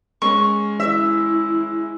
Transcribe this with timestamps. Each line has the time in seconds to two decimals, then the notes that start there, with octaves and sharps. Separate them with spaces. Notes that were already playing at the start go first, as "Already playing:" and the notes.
0.22 G#3 C#4 C#6
0.80 E4 E5